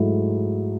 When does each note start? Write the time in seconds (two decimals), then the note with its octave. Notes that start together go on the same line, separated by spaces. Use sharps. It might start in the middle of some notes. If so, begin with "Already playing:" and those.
Already playing: G#2 F#3 A3 E4